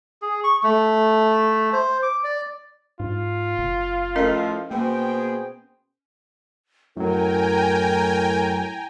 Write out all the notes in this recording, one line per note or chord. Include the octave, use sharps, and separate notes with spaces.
G#4
C#6
A3
C5
D6
D5
G#2 F4
F#1
A2 F3 C#4 A#4 D#5
B2 A#3 G#4 C5 G5
F#2 A2 F#3 A#4 G5 G#5 A#5